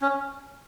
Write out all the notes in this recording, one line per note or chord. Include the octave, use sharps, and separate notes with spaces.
C#4